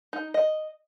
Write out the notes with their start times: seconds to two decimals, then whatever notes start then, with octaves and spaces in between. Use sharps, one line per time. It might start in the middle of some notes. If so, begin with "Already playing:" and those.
0.13 D#4
0.34 D#5